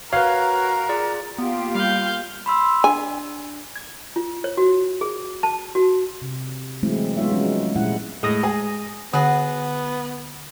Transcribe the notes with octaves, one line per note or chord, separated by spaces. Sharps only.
F#4 A#4 B4 C#5 F5
F4 G#4 D5
A#3 B3 F4 G4
G3 F5 G6
B5 C6 E6
D4 G#5
G#6
F4
C#5
F#4
G#4
A5
F#4
C3
E3 F#3 G#3 A3 C4 E4
G#3 B3 D#4 F4 C#5 E5
F3 F#3 G#3 C#4
A#2 G3 G#3 E4 F#5
A2 G#3 D#6 A#6
G#4
D3 B3 F#4 G#4 F#5